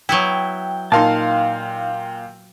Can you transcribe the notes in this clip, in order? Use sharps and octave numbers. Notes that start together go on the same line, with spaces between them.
F#3 B3 E4 G5
A#2 D#4 A#4 F5 A5 C6